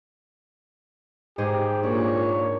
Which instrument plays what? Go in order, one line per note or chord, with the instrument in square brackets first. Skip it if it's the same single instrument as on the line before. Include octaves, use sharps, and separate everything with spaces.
[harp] G#2 G#4 C5 [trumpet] G4
[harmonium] A#2 A#3 [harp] D4 [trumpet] C#5